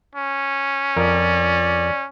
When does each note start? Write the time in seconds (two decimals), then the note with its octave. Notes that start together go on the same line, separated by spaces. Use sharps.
0.15 C#4
0.96 F2 A#4 D5